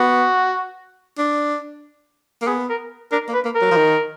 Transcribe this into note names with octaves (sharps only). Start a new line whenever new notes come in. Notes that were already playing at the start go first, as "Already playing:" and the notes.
Already playing: B3 F#4
D4
A#3
B3 G#4
A#4
D4 A#4
A#3
B4
A#3
A#4
F#3
F3
D#3